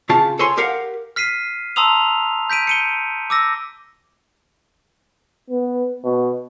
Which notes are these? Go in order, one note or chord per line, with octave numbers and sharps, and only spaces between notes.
C#3 F4 A5
A4 C#5 G#5 C6
G4 A#4 F5 F#5
F6 B6 C7 D#7
A5 A#5 C6 D#6 E6 F7
G6 B6 D7 D#7
C#7 D#7 G7
D6 E6 A#6
B3
B2